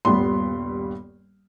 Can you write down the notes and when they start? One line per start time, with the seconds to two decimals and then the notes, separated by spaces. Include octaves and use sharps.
0.05 D#1 G2 G3 B3 C6